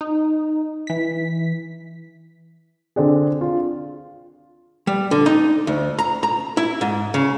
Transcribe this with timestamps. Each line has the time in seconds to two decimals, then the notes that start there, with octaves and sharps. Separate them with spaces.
0.01 D#4
0.87 E3 B6
2.96 D3 C4 D4 G#4
3.41 F4
4.87 G3
5.11 D3
5.26 D#4
5.67 D2
5.99 A#5
6.23 A#5
6.57 E4
6.81 G#2
7.14 C#3